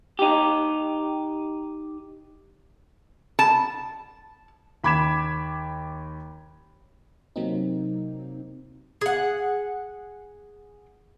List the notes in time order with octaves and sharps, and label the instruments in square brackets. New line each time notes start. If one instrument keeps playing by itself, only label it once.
[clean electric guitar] D#4 G4
[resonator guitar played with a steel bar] A5
[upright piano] D#2 B5 D6 G#6 B6 E7
[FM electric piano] C3 F#3 A#3 C4 D#4
[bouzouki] G#4 F#5